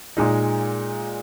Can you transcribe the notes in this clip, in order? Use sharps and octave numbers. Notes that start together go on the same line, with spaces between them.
A#2 G#3 D#4